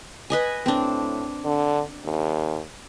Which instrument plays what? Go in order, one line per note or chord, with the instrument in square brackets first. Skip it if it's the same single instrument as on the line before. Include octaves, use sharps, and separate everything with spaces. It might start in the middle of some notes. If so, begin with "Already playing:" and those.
[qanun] B4 D#5 G#5
[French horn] A2 [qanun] C4 D4
[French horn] D3
D#2